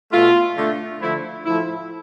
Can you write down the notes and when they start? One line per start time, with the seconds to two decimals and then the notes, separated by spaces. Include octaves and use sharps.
0.12 B2 A3 F4
0.58 D3 A3
1.01 D3 F3 A3 E4
1.45 A2 F3 A3 E4